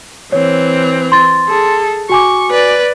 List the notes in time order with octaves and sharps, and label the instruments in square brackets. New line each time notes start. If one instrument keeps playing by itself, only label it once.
[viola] E3 C4 [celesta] C#5
[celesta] C6 A6
[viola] G#4 A4
[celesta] F#4 G#5 D6 [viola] C#6
[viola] B4 D5